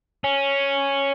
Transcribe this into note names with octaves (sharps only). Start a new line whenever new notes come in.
C#4